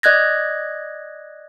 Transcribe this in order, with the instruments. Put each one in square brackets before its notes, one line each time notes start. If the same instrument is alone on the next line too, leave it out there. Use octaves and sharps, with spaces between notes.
[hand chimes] D5 D#5 F#6 G#6 A#6